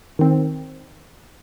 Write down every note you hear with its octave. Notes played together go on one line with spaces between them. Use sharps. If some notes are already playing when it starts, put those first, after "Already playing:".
D#3 C4